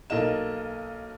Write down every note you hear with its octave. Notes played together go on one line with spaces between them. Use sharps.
B1 A#3 A4 D#5 E7